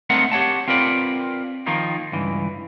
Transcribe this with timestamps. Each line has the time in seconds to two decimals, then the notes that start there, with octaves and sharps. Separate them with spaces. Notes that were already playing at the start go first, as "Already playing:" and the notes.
0.10 A3 C4 D4 D#4 A#4 F#5
0.32 G4 C#5 F#5 A5
0.68 C4 F4 A#4 B4 D5
1.66 D#3 F3 A#3 D#4
2.12 C#2 G2 E3